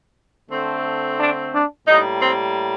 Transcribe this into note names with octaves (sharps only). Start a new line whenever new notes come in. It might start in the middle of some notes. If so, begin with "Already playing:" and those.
D3 A3 C4
D4
D4
A2 G3 A#3 D#4
C4